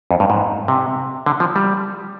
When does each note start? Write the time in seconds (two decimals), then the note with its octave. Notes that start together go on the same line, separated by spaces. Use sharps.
0.11 F2
0.20 G2
0.30 G#2
0.68 C3
1.26 D3
1.40 F3
1.56 G3